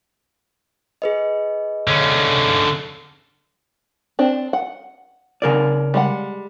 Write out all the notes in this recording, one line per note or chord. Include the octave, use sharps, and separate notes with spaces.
G#4 B4 D#5
D3 C#4
C4 D4
F#5
C#3 A#4 D5
G3 G#3 F#5